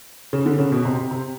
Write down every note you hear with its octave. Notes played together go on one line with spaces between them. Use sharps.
C#3
D3
C#3
B2
C3
C3
C3